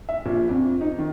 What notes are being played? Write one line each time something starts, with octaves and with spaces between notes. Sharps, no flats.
E5
A#1
F2
D#4
D#3